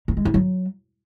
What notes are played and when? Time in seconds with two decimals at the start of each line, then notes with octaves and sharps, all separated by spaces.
0.08 A#3
0.17 G#3
0.25 E4
0.34 F#3